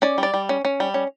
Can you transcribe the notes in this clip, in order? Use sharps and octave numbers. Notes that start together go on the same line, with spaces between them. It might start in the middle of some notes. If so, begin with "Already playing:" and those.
C#4 D5
G3 D5
G3
C#4
C#4
G3
C#4